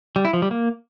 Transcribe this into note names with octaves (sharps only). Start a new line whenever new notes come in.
G3
E4
F3
G3
A#3